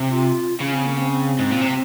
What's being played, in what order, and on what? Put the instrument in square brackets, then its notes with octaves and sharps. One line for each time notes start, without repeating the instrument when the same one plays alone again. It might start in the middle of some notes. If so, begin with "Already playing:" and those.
Already playing: [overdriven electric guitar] C3
[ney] F4
[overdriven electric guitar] C#3 [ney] C#4
[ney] C4
A#3
C4
C4
[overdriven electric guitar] G#2
A#2
C3